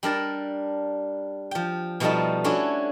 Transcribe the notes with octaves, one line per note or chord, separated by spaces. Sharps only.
G3 D4 A#4 A5
F3 G5
B2 F3 G3 A3 D#4 A5
C#4 D4 E4 F#4 A4 C#5